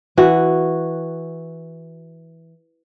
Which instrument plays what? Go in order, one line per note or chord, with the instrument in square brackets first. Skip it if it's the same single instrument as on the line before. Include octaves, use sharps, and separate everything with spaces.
[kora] E3 F#4